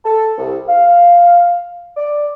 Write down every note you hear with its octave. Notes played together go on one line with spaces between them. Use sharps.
A4
C2
F5
D5